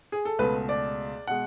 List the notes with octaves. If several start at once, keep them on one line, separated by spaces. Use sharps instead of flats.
G#4
A4
C#2 B2 A3 B4
D5
B2 G#3 F#5